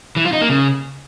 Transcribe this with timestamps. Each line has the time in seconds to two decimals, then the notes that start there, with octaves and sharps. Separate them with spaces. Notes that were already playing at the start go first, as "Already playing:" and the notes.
0.16 E3
0.25 F4
0.33 D#4
0.41 A#3
0.49 C#3